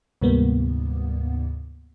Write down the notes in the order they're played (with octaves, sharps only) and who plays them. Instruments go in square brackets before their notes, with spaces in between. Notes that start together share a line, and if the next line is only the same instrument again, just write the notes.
[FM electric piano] D2 G#2 C3 G3 A#3 B3